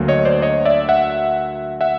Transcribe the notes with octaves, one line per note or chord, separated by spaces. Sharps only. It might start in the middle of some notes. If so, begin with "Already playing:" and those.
Already playing: D2 D3 F#3 A#3
C#5 D#5
C5 D5
C#5 D#5
D5 E5
E5 F#5
E5 F#5